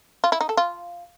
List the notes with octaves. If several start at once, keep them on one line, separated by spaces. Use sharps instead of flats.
F4
E4
D#4
A4
F4